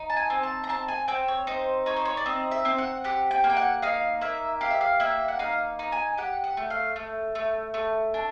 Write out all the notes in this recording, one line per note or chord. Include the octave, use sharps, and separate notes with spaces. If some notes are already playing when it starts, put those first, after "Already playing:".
Already playing: D#4
A5
G#5
C4
A5
A#5
C4 A5
G#5
C4 G5
C#5
D#4 C5
D#4 C#5
C5
C#5
D5
C4 D#5
E5
C4
F#5
G4 F#5
G5
A#3
G5
F#5
D#4 F5
A#3 E5
G4 F5
E5
F5
A#3 E5
F#5
D#4 F5
D#4
G#5
G4 F#5
F#5
A3
F5
A3
A3
A3
D4